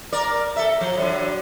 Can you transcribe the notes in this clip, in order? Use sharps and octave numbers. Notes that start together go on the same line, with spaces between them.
A#4 D5
A4 E5
F3
D3 F#3